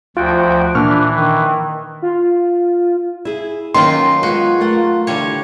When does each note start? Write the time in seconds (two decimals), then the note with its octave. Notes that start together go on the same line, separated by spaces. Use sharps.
0.17 D2 F3 F4 F#4 G5
0.75 A#2 E3 D4 C#6 F6
1.10 D#3
2.02 F4
3.25 E4 G#4
3.74 D#3 F#3 A#3 C#4 F4 B4 G5 C6
4.23 G#3 B3 F4 F#4
4.61 A3 A#4 F#5
5.07 D3 E3 G3 C#5